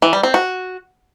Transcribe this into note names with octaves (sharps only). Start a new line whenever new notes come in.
E3
G3
C4
F#4